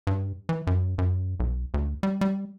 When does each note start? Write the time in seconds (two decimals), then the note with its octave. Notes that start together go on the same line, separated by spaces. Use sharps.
0.07 G2
0.49 E3
0.67 F#2
0.98 F#2
1.40 B1
1.74 D2
2.03 G3
2.21 G3